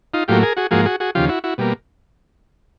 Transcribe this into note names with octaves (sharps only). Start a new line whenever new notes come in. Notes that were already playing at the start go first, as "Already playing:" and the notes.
D#4 F4
A2 F#3 A#3 F4 G4
G#4 A#4
F#4 G#4
G#2 F3 A#3 F#4 G#4
F#4 G#4
F#4 G#4
D#2 C#3 F3 F4 G4
E4 F#4
E4 F#4
B2 G3 A#3